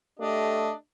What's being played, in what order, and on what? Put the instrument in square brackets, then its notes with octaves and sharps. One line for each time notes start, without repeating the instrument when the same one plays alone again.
[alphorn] A3 [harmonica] D4 G4 D#5